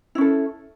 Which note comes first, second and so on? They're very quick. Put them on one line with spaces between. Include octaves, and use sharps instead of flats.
E4 C#4 A4